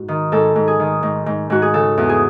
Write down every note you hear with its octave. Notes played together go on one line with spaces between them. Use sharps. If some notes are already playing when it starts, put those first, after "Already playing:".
Already playing: G#2 F#4
D#3
G#2 A4
G#2
G#4
D#3
G#2
G#2
G#2 F#4
G#4
C#3 A4
E2
G#4